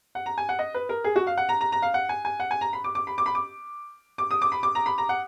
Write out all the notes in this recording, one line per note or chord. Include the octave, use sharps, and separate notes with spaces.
F#5
A#5
G#5
F#5
D#5
B4
A#4
G#4
F#4
F5
F#5
A#5
A#5
A#5
F5
F#5
G#5
G#5
F#5
G#5
A#5
B5
D6
D6
B5
D6
B5
D6
D6
D#6
D6
B5
D6
A#5
B5
A#5
F#5